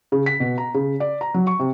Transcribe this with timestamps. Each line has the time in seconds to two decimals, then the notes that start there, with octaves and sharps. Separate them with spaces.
0.12 C#3
0.26 B6
0.40 B2
0.58 A#5
0.74 C#3
1.00 D5
1.21 A#5
1.34 F#3
1.47 C#6
1.59 C3